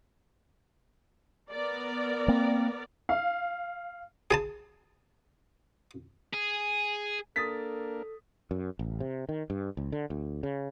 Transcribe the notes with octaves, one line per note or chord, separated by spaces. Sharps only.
B3 A#4 D5
A#3 C4
F5
G#4 G#5 A5
G#4
A#3 D4 A4 A#4 D#6 A6 B6
F#2
A1
C3
D#3
G2
C#2
D3
D2
C#3